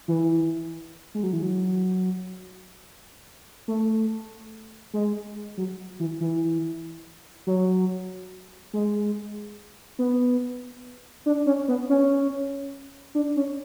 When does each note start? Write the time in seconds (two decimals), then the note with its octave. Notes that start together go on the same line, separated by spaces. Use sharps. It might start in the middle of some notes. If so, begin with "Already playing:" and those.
0.08 E3
1.15 G#3
1.23 F#3
1.33 E3
1.42 F#3
3.68 A3
4.94 G#3
5.57 F#3
6.00 E3
6.20 E3
7.47 F#3
8.73 G#3
9.99 B3
11.26 D4
11.46 C#4
11.68 B3
11.89 C#4
13.15 D4
13.37 C#4